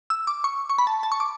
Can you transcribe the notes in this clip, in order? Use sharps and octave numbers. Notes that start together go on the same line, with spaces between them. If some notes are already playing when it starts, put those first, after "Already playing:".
E6
D6
C#6
C#6
B5
A5
A5
C#6
D6